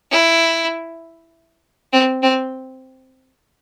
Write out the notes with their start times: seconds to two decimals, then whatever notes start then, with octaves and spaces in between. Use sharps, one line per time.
0.11 E4
1.93 C4
2.23 C4